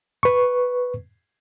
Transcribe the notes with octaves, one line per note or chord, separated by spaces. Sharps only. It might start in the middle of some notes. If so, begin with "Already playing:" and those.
B4 C#6